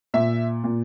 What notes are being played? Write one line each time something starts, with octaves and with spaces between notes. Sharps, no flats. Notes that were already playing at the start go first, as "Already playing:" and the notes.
A#2 E5
A#2